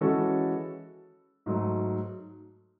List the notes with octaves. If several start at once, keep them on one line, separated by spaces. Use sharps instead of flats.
E3 G#3 C#4 F#4 A4
G#2 F#3 A3